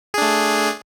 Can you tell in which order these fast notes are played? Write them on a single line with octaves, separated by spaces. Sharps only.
G#4 D4 A3